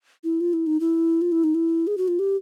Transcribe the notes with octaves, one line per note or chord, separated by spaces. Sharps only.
E4
F4
E4
D#4
E4
F4
E4
D#4
E4
G#4
F#4
F4
G4